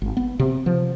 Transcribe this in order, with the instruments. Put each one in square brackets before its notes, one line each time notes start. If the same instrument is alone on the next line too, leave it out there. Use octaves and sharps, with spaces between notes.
[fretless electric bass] G#1
B3
C3
F3